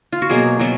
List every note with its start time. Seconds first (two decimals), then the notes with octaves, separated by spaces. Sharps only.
0.12 F4
0.22 F#4
0.29 B2 F#3 A#3 G#4
0.59 B2 F#3 B3